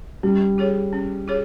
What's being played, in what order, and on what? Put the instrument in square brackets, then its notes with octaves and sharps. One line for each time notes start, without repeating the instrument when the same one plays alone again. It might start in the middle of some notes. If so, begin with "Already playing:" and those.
[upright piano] G3 [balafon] C#4
[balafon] F4 G#4 C#5
C#4
F4 G#4 C#5